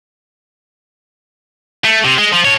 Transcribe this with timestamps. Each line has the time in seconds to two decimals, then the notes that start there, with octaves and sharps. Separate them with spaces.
1.84 A3
2.05 C3
2.18 G#3
2.33 F3
2.45 A4 C#5